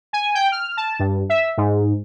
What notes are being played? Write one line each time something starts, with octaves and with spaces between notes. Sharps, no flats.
G#5
G5
F6
A5
G2
E5
G#2